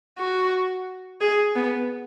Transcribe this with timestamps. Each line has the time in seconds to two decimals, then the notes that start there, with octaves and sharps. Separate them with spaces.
0.18 F#4
1.21 G#4
1.56 B3